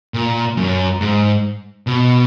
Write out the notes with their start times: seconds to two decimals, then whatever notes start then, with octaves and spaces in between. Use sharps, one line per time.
0.14 A#2
0.57 F#2
1.01 G#2
1.87 B2